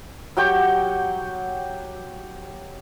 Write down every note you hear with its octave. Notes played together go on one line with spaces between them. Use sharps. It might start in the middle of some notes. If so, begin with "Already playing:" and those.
F#3 G4 G5 C#6